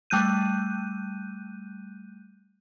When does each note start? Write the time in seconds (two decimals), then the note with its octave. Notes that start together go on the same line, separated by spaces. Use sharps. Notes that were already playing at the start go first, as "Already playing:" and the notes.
0.10 G3 A3 F#6 G6 D#7